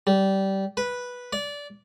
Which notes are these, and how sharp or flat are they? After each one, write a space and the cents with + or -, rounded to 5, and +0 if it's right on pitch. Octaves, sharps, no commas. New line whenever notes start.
G3 -20
B4 -10
D5 -20